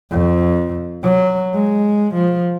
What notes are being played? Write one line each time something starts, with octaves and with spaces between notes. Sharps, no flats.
F2
F#3
G#3
F3